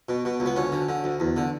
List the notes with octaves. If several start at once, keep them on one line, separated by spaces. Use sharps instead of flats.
B2
B2
C#2
B3
D2 C#4
D3
D3
D2
E2
D3